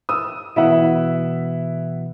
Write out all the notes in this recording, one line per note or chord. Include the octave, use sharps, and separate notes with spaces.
D#6 E6
B2 E3 E4 E5 F#5